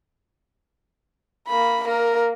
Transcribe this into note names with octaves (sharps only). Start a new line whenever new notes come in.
A#3 B5
A#3 A#4